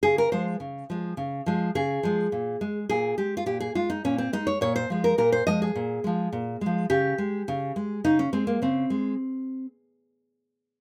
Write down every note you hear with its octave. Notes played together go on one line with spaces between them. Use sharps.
C#3 G#4
A#4
F3 G#3 C5
C#3
F3 G#3
C#3
F3 G#3
C#3 G#4
F3 G#3
A#2
G#3
A#2 G#4
G#3 G4
F4
A#2 G4
G#4
G#3 F4
D#4
A#2 C#4
C4
G#3 D#4
C#5
A#2 C#5
C5
F3 G#3
A#4
A#2 A#4
C5
F3 G#3 D#5
G#4
A#2
F3 G#3
A#2
F3 G#3
C#3 G4
G#3
C#3
G#3
C#3 D#4
C#4
G#3 C4
A#3
C#3 C4
G#3